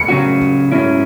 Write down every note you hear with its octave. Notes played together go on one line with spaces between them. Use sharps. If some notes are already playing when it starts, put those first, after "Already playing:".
Already playing: C#7
C#3 F#3 C#4 F#4
G#2 F#3 C#4 E4